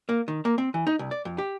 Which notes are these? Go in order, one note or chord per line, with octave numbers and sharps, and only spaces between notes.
A#3
D#3
A#3
C4
E3
D#4
C2
D5
F2
G4